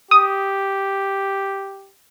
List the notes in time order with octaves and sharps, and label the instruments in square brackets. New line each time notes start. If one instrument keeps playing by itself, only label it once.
[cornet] G4 [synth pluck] D#6